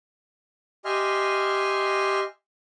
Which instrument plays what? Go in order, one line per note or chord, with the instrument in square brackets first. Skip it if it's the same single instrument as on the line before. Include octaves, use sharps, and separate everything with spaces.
[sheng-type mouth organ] G4 D#5 E5 G#5 C6 F6